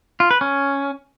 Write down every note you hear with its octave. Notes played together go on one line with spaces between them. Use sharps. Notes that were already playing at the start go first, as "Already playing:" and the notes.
F4
B4
C#4